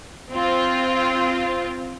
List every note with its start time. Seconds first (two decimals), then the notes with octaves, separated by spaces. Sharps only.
0.32 C4 F4